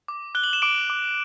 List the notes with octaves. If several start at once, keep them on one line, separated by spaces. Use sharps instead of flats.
D6
F#6 G7
F#7
E7
D6 D7
D6